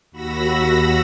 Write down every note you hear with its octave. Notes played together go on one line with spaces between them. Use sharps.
D#2 F#4 B5 E6 A#6